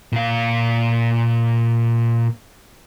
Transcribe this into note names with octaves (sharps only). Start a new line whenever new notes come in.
A#2 F5